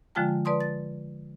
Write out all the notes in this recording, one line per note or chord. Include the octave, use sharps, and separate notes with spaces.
D3 F3 G#3 F4 G5 A5
B4 D5 A5 C6 D#6
A6